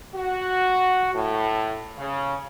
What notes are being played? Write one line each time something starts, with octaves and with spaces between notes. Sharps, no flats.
F#4
A2
C#3